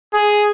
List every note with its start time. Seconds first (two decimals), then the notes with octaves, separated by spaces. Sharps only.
0.14 G#4